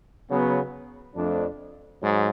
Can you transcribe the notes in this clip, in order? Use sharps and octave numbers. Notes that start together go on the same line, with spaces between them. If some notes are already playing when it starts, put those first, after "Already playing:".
C#3 F#3 B3
F2 F3 A3 D4
G#2 F#3